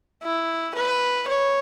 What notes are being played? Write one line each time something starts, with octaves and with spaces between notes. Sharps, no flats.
E4
B4
C#5